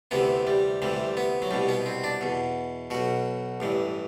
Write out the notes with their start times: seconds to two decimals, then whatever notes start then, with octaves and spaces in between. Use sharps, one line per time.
0.11 D2 C3 E3 B3
0.47 G3
0.82 D2 C3 E3 G3
1.17 B3
1.42 F#3
1.51 C2 B2 G3
1.68 B3
1.86 C4
2.04 D4
2.21 E2 B2
2.90 B1 B2 F#4
3.60 A1 G2 E3